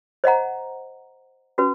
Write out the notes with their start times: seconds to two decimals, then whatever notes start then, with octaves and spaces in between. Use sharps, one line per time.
0.24 C5 D#5 F#5 A#5
1.58 C#4 F#4 B4